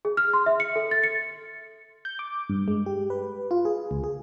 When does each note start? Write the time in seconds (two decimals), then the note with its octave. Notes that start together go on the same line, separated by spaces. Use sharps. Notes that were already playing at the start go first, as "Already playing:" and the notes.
0.05 G#4
0.17 F6
0.33 C6
0.46 E5
0.60 C#7
0.76 A4
0.91 A6
1.03 C#7
2.05 G6
2.19 D6
2.50 G2
2.68 G#3
2.86 G4
3.10 B4
3.51 F4
3.65 G#4
3.91 C#2
4.04 G#4